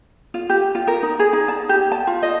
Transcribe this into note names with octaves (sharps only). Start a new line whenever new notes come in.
F4
G4
F4
A#4
D#4
G#4
D#4
A5
G4
A5
F4
D#5